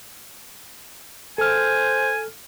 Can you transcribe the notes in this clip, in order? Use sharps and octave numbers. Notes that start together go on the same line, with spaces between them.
A4 C5 G#5 F6